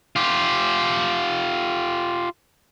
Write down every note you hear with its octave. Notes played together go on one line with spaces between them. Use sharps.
F4 G4